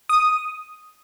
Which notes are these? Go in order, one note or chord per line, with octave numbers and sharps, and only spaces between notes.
D#6